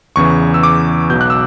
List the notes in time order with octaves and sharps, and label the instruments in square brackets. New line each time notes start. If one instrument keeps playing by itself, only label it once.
[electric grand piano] E2 C#3 E3 C#6
E6
D6
B1 B2 G6
F#6
E6